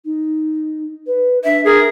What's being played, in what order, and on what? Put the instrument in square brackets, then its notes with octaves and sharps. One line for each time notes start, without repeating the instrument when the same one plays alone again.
[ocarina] D#4
B4
[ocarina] D4 [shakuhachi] E5
[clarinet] G#4 [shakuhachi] A#4